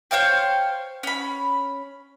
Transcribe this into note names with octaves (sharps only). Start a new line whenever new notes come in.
C5 C#5 F5 G5
C#4 B5